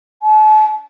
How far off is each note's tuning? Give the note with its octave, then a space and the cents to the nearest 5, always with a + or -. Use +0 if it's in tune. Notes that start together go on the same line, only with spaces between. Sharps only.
A5 -40